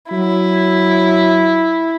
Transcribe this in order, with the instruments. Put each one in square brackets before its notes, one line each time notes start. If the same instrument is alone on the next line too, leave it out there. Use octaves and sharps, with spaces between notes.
[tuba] F#3 [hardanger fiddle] E4